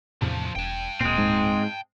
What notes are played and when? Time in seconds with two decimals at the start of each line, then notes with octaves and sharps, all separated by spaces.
0.22 E2 A2 C3 F3 D4
0.56 E1 G5 A5
1.01 D1 A#2 G#3 C4
1.18 G#2